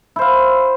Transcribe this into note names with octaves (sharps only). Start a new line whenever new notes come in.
E4 C5 F5